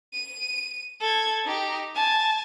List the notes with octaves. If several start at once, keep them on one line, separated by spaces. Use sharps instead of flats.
D#7
A4 G#6
D#4 G4
G#5 A5